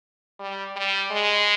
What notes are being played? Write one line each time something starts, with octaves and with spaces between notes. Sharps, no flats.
G3
G3
G#3